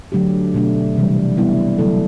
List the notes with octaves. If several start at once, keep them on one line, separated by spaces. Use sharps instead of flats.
D3 F#3 A3 D4 G4
B2 A3 D4
C3 E3 G3
G3 B3 E4
D3 F#3 A3 E4 A4